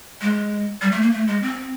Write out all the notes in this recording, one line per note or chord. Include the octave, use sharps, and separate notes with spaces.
G#3
G3
A3
A#3
A3
G#3
C4